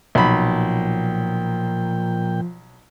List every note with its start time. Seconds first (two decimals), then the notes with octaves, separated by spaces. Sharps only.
0.15 B1 A#2 F3 G5 B5